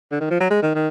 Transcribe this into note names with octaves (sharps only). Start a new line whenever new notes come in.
D3
D#3
F3
F#3
G#3
D#3
D#3